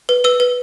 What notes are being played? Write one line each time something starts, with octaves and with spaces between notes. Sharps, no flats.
B4
B4 E6
B4